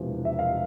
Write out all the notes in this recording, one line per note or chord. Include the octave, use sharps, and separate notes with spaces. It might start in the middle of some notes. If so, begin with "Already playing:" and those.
Already playing: E1 E2 C3 F3
E5
F5